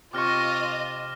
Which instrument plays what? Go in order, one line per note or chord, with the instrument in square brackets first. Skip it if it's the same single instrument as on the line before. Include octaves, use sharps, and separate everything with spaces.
[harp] C3 C#6 [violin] F4 D#5 [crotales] D6 F6 A#6